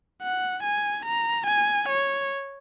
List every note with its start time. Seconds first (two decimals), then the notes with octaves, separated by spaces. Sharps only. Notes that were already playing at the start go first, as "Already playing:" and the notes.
0.22 F#5
0.63 G#5
1.05 A#5
1.47 G#5
1.89 C#5